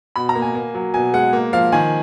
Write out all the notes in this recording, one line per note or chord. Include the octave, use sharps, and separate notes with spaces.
B2 B5
A#5
A#3
G#5
A#3
F#3
B2 G#5
G#3 F#5
A#3
F3 F5
D#3 G#5